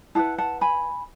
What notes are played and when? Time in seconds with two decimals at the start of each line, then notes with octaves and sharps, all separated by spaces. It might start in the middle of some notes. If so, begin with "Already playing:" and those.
0.15 E4 G#4 B4 F#5 A5
0.38 F#5 A5
0.61 G#5 B5